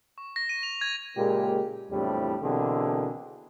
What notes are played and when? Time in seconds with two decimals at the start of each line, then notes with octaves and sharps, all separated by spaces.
0.18 C#6
0.36 A#6
0.49 D#7
0.63 F7
0.81 G#6
1.17 A#2 C#3 G#3 A#3 G4
1.91 E2 A2 C3 F3 G3 D4
2.43 B2 D3 E3 A#3 C4 G#4